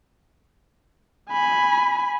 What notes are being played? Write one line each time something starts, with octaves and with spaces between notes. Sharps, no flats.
G#5 B5